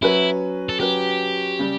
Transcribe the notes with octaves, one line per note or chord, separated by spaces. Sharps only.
F#3 C#4 E4 F#4 B4
A4
F#3 C#4 F#4 G4 B4
C#3 G3